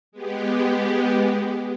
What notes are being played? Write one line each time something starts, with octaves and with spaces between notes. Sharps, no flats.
G#3 B3 G4